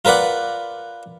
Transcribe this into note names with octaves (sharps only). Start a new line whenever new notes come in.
F4 A#4 B4 D5 F#5